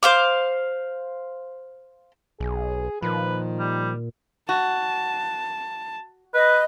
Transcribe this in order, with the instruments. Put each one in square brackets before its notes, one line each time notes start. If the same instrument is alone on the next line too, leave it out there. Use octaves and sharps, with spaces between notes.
[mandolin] C5 F5 D6
[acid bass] B1 [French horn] G#4
[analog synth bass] A#2 [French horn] D#3 [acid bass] F3 [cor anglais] B4
[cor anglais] G3
[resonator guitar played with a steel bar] F#4 [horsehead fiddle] A5
[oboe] B4 [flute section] D#5